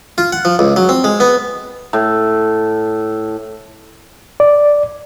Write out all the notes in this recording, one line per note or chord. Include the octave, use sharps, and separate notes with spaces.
F4
F#5
F3
C#2
F#3
C4
G#3
B3
A2
D5